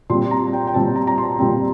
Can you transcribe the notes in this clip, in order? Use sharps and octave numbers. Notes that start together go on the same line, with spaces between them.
A#2 G3 C4 C6
A#5
G5
G5
A#2 G3 C4 A5
A#5
A#5
C6
A#2 G3 C4